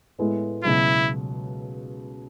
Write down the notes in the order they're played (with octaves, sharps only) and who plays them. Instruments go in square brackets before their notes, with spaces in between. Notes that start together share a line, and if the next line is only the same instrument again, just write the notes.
[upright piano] A2 G#3 B3 E4
[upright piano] C#2 B2 F#3 [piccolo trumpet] E4